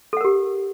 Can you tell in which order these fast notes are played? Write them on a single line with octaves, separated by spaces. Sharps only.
A4 F#5 A#4 G4